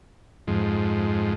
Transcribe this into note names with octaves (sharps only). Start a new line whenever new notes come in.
F2 G#2